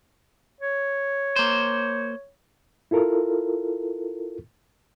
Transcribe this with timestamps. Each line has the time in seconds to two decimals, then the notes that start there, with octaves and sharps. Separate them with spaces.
0.61 C#5
1.36 A#3 C5
2.91 E4 F4 A4 A#4